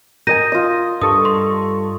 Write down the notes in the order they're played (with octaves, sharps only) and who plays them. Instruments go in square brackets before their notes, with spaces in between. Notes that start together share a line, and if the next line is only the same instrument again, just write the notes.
[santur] A#4 D#5 G#5 [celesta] G6 A#6 D#7
[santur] F4 D#5
[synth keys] G2 A4 C#6 [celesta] D#6
[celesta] C6